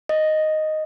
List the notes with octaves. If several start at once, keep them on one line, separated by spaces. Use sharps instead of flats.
D#5